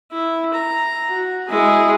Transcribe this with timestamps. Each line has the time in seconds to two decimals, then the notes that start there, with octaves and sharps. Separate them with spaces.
0.12 E4
0.53 A#5
1.07 F#4
1.49 G#3 E4 G#4